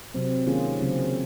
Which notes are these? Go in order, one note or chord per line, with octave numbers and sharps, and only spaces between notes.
C3 F#3 C4
D#3 A#3 C#4 F4 G#4
C#3 F#3 C4